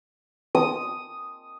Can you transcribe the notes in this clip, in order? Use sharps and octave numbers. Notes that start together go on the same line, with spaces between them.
D#6